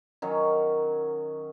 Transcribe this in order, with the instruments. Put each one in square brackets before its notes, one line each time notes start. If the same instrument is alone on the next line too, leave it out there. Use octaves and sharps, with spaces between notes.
[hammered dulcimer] D#3 F#3 C#4